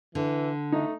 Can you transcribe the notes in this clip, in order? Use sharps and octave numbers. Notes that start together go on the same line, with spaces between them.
D3 E3
A3 D#4